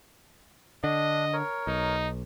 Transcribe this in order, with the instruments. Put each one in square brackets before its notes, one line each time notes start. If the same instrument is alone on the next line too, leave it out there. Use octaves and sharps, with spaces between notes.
[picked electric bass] D3 [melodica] D4 [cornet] D#5
[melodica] A#4 C#5
[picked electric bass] B1 [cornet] D#4